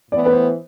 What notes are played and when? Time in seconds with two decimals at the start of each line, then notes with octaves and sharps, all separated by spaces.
0.11 A2 E3 B3 D5
0.26 B4
0.32 C5